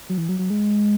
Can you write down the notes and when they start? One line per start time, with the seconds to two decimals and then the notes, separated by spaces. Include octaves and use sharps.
0.09 F#3
0.18 E3
0.29 F#3
0.39 F#3
0.50 G#3